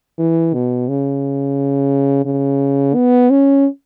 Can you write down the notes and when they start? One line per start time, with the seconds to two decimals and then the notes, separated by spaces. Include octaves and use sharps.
0.19 E3
0.54 B2
0.88 C#3
2.25 C#3
2.95 B3
3.30 C#4